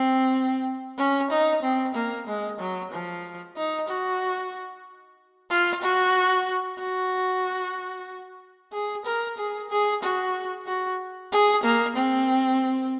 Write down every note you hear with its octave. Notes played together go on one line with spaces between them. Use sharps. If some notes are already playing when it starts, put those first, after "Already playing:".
Already playing: C4
C#4
D#4
C4
A#3
G#3
F#3
F3
D#4
F#4
F4
F#4
F#4
G#4
A#4
G#4
G#4
F#4
F#4
G#4
A#3
C4